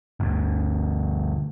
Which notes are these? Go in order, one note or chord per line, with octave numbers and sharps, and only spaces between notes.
G1 D2